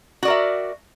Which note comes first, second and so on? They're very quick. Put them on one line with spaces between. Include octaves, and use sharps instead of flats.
F#4 D5 A#4 E5